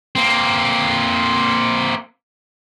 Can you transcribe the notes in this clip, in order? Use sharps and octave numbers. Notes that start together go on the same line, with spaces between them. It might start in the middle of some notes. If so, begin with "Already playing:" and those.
A#3 C4